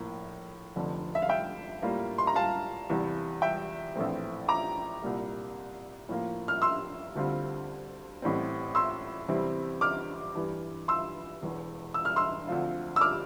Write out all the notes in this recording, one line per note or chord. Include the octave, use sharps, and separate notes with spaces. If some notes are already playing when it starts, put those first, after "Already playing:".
Already playing: A#1 A2 F3 A#3
F1 F2 D3
E5
F5
E5 G5
A2 G3 A#3 F4
C6
A#5
F5 A5
E2 C3 E3 G3
E5 G5
A#1 A2 E3 A3 C4
A#5 D6
C2 A#2 G3 A#3
A2 F3 A#3 F4
F6
C6 E6
D2 D3 G3 C4 F4
A1 A2 G3 C4
C6 E6
E2 C3 G3 C4 E4
D6 F6
G2 E3 G3
C6 E6
E1 E2 E3
E6
F6
C6 E6
D2 D3 F3 C4 F4
E6
D6 F6